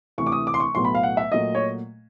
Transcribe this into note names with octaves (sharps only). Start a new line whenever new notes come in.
D2 C3 E3 C#6
D6
D#6
D6
C6
C#6
B1 A2 F#3 B3 C6
B5
F5
F#5
E5
A#2 F#3 A3 D#5
C#5